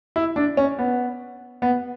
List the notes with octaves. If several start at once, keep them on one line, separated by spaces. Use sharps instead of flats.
E4
D4
C#4
B3
B3